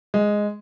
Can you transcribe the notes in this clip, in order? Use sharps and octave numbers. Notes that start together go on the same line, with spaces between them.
G#3